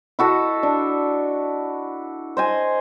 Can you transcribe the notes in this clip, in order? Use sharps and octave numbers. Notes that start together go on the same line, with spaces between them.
E4 F#4 A4 D#5
D4
C5 D#5 G#5